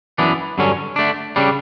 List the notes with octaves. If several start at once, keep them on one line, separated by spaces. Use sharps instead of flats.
F#2 E3 B3 D4
G2 D3 F#3 C#4
D3 A3 D4
C#3 G3 D4